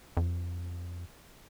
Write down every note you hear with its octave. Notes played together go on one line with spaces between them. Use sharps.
F2